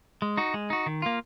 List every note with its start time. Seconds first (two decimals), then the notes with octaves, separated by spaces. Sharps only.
0.22 G#3
0.37 D#4 F#4
0.54 G#3
0.70 D#4 F#4
0.86 D#3
1.02 A#3 F4